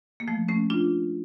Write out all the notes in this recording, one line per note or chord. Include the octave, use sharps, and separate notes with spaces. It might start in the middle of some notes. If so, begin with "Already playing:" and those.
A#3
F3 A3
A3 C#4
D4 F4